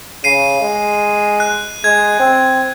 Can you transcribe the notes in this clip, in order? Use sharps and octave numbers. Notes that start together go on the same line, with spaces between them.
C#3 C7 D#7
G#3
F#6
G#3 G#6
C4